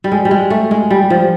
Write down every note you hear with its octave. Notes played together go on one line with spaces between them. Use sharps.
G3
G#3
G3
G#3
A3
G#3
G3
F3